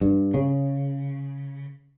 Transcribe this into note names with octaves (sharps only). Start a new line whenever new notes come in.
G2
C#3